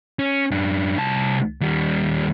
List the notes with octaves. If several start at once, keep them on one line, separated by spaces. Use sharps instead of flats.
C#4
F#2 D4
C2 A5
D#2 G3